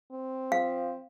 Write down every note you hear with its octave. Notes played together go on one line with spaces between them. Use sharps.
C4
F3 F5